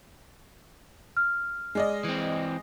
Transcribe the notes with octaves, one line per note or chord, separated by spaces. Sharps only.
F6
G#3 D5 D#5
E3 C4